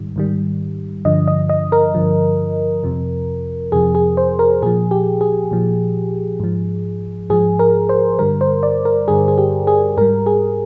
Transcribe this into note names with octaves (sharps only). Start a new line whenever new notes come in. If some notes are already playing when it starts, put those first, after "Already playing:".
Already playing: G#2 D#3 G3
G#2 D#3 G3
G2 D3 F3 D#5
D#5
D#5
A#4
G2 D3 F3
F2 C3 F3
F2 C3 F3 G#4
G#4
C5
A#4
A#2 F3 G#4
G4
G#4
A#2 F3
G#2 F3
G#2 F3 G#4
A#4
C5
G2 D3 G3 A#4
C5
D5
A#4
G2 D3 G3 G#4
G#4
G4
G#4
G#2 G3 A#4
G#4